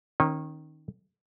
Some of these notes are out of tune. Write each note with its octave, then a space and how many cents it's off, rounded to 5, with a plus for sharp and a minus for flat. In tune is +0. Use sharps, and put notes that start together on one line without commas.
D#3 +0 C#4 -35